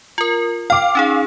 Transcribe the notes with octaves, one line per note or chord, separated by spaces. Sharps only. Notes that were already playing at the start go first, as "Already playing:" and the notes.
F4 A#4
F5 G5 D6 F6
C#4 D#4 G#4